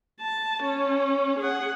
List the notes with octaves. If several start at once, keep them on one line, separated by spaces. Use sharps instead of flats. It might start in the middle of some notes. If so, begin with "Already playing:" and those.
A5
C#4
G#4 F#5